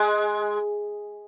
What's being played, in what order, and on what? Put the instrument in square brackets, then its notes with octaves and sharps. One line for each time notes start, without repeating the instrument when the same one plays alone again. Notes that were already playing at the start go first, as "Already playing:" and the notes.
Already playing: [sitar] G#3